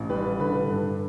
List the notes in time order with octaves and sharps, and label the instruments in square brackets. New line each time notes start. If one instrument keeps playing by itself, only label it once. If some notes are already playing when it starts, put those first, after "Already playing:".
Already playing: [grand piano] A1
G3 B4
D3 B4
G2